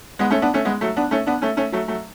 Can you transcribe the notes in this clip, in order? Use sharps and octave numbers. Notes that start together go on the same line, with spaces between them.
G#3 B3
A3 C#4
B3 D4
A3 C#4
G#3 B3
F#3 A3
B3 D4
A3 C#4
B3 D4
A3 C#4
A3 C#4
F#3 A3
F#3 A3